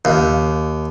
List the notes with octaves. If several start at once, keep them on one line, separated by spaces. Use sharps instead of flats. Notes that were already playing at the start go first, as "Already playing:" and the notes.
D#2